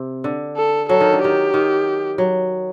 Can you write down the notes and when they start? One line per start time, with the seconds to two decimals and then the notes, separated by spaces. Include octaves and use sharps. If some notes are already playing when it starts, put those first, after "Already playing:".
Already playing: C3
0.24 D3
0.57 A4
0.89 F#3 A4
1.01 D#3
1.13 D3
1.22 D#3 G4
1.54 D#3
2.18 F#3